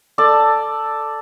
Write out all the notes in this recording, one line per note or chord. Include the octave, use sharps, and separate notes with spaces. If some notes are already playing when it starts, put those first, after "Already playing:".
A4 D5 A5